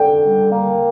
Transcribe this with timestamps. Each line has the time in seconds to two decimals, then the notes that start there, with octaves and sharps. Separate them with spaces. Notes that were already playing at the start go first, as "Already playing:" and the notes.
Already playing: D3 G5
0.19 G3
0.49 A#3